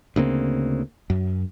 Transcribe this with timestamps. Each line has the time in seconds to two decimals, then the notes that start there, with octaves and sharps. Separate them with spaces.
0.16 D2 C#3 A#3 C4
1.10 F#2